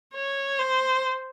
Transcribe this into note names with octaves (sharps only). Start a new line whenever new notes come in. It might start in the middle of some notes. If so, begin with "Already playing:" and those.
C#5
C5